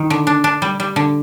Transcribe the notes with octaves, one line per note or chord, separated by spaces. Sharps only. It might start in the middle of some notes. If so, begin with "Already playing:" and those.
Already playing: D#3
D3
D4
D4
G3
G3
D3